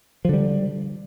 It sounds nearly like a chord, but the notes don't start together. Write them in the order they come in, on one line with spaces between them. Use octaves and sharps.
F3 D3 G3